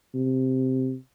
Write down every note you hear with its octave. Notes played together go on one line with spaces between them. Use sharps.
C3